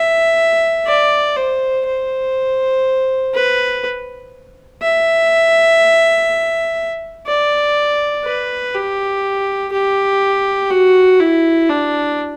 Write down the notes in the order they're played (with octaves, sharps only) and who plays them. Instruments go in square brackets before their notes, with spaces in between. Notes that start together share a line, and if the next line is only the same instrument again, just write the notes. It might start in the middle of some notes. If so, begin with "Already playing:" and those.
Already playing: [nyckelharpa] E5
D5
C5
C5
B4
E5
D5
B4
G4
G4
F#4
E4
D4